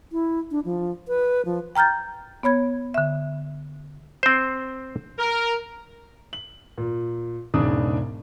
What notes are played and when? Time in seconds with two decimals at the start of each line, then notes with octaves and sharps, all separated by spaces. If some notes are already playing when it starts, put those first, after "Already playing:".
0.12 E4
0.51 D4
0.65 F3
1.08 B4
1.45 F3
1.75 G5 A#5 F6 G6 A6
2.43 B3 C#5 B5 G#6
2.94 D3 E5
4.23 C4 C5
5.19 A#4
6.33 F#7
6.78 A#2
7.54 E1 G#2 C#3 D4 D5 D#6